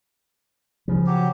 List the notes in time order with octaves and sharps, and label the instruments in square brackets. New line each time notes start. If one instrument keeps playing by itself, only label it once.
[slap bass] C#3 F3
[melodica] F#3 G4